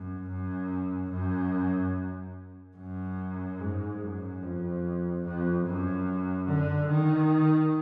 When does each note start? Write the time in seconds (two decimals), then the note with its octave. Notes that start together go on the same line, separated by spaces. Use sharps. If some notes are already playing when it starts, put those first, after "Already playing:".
Already playing: F#2
0.29 F#2
1.11 F#2
2.77 F#2
3.59 G#2
4.00 F#2
4.42 F2
5.24 F2
5.65 F#2
6.48 D3
6.89 D#3